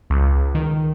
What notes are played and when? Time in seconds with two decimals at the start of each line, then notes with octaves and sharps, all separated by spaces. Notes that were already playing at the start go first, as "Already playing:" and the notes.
0.10 C#2
0.55 D#3